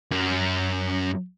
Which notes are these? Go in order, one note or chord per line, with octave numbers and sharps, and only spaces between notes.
F#2